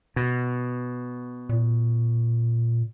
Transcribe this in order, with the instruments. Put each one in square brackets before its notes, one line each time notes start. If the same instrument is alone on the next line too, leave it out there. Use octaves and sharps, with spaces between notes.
[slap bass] B2
[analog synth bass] A#2